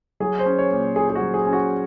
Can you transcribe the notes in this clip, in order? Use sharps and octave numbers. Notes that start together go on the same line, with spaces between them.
F#3 G#4
C5
C#4
C#5
A#2
A#2 G#4
G#4
F#4
F#3
G#4
C#4
F#4